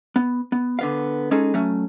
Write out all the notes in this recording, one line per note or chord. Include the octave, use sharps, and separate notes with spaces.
B3
B3
D3 B3 F5
G#3 C#4 D#4 G#4 A4
F#3 A3 C#4